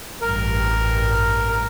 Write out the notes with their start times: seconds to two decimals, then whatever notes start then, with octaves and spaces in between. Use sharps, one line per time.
0.21 A1 G2 A#4